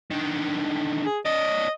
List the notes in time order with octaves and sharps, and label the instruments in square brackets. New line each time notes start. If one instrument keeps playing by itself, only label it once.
[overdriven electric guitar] D3 D#3
[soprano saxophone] G#4
[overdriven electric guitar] C#4 D5 [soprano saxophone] D#5